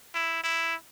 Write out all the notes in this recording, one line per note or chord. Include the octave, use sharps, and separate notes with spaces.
E4
E4